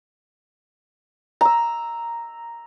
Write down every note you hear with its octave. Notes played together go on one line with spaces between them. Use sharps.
A#5 E6